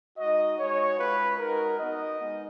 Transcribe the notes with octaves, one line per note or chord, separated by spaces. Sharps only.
G#3 D#4 F#4 D#5
G#3 D#4 F#4 C#5
G#3 C#4 F4 B4
G#3 D#4 F#4 A#4
B3 D#4 F#4 D#5
G#3 D#4